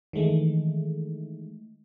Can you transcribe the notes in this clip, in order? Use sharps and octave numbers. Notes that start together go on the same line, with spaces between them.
D#3 E3 G#3 A3